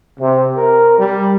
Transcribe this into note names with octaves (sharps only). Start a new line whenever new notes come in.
C3
A#4
G3